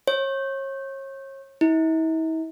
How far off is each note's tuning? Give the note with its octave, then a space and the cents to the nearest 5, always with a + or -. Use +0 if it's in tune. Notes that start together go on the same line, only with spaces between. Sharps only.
C#5 -35
E4 -45